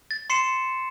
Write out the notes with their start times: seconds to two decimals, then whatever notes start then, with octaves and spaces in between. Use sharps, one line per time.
0.11 A6
0.30 C6 C7 C#7 E7